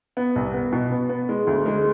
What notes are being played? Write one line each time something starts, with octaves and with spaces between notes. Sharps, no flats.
B3
C2
B3
B2
B3
B3
G#3
D2
G#3